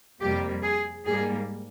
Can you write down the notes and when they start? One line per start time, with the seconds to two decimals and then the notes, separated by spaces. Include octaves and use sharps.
0.21 F2 C3 G3 A#3 G4
0.63 G#4
1.04 G#2 G3 A#3 G#4